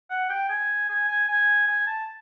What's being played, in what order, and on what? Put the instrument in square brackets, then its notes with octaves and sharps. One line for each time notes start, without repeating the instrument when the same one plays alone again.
[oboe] F#5
G5
G#5
G#5
G#5
G#5
G#5
A5